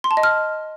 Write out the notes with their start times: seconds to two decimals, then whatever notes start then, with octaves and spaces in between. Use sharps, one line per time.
0.04 C6
0.11 A5
0.17 D#5
0.23 F6